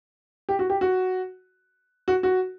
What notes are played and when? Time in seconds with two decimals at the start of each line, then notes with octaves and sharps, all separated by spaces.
0.49 G4
0.59 F#4
0.70 G4
0.81 F#4
2.08 F#4
2.23 F#4